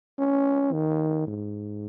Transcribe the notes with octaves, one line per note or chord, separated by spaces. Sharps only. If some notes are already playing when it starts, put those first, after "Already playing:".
C#4
D#3
G#2